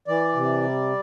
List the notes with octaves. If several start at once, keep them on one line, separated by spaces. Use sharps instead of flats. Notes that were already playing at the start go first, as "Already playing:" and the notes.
E3 D5
C3
G3